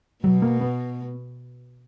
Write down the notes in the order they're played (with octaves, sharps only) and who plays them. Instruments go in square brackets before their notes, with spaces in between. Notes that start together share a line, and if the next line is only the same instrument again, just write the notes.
[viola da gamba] B2 [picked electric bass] F#3
[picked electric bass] A#3
B3